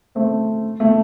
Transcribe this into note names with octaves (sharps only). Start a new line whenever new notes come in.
A3 C4
A3